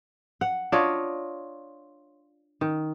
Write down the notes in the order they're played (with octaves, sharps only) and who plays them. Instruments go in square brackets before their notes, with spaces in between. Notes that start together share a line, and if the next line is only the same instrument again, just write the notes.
[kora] F#5
D4 F4 C#5 D#5
D#3